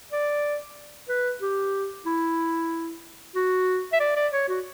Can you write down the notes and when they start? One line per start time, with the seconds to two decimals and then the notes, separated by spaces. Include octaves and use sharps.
0.12 D5
1.09 B4
1.42 G4
2.05 E4
3.36 F#4
3.93 E5
4.00 D5
4.16 D5
4.33 C#5
4.49 F#4